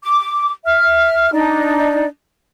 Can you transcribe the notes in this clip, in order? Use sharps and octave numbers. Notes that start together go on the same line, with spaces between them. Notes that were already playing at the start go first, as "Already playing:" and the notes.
D6
E5 F6
D4 D#4 D5